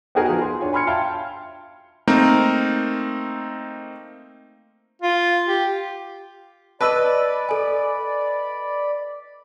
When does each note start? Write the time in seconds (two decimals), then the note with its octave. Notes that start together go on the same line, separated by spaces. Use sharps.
0.15 B3 D#4 F#4 G#4 A#4 B4
0.29 F3
0.42 C6
0.61 D4 F4 C#5 G#5
0.73 G#5 B5 C6 F6 G#6 C#7
0.87 E5 F5 G5 A5 C6 F6
2.08 A3 A#3 C4 D#4 A#4
5.02 F4
5.48 G4
6.81 B4 D5 D#5 A5 B5 E6
7.49 A4 G#5